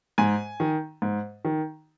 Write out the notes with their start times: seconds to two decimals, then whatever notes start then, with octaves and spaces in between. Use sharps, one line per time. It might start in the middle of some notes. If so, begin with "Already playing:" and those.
0.18 G#2 G#5
0.60 D#3
1.02 G#2
1.45 D#3